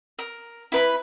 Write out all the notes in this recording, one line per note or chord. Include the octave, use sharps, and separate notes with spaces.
A#4
E4 B4 B5